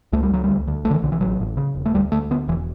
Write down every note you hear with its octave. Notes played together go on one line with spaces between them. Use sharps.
C#2 A3
G3
C#2 F#3
D2 G3
D2
B1 A3
D3
E3
B1 D3
E3
A1 F#3
A1
C#3
E1
A3
D2 G3
D2 A3
D3 B3
E1 E3